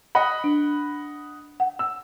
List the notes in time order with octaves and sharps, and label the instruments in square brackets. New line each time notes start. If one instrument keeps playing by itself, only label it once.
[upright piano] D#5 F#5 B5
[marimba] D4
F#5
[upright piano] E6